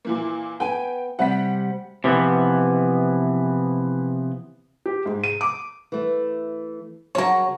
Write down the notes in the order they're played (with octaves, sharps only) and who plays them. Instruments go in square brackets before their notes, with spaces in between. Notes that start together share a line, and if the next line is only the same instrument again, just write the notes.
[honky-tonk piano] A#2 E3 A#3
[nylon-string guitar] B3 G#5 [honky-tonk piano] G5
[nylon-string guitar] C3 G3 [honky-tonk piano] F#5 B6
[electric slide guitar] C3 E3 F3 B3
[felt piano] G4
G#2
D#7
D6
[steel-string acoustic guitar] E3 A3
[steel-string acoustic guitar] C#3 F#3 F#4 [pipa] A#4 C#5